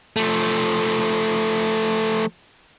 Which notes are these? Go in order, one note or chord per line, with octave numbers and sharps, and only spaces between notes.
F3 A3